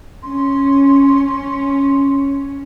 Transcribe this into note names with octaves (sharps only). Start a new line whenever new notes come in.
C#4 C6